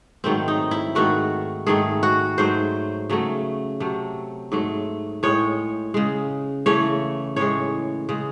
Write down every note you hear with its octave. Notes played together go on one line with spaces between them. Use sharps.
G#2 D#3 F#3 A3 C4
D#4
E4
G#2 D#3 A3 F#4
G#2 D#3 A3 G#4
F#4
G#2 F#3 A3 C5
C#3 F#3 A3
C3 F#3 A3
G#2 F#3 A3
A2 G#3 C#5
C#3 G#3
C#3 E3 A3 C#5
A2 E3 G#3 C#5
C#3 G#3